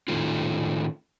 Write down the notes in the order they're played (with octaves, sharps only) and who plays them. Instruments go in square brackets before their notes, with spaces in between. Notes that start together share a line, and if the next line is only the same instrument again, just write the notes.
[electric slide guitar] A2 D#3 A3 C#4 D#4 F4